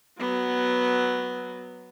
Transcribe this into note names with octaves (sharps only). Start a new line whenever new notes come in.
F#3 B3